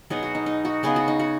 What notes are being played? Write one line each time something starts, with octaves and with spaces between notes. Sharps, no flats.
B2 F#3 B3 D#4 G#4
F#4
D#4
D#4
F#4
C#3 B3 D#4 G#4
F#4
D#4
F#4